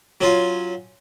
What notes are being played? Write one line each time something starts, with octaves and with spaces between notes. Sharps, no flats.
F#3 C#4 F4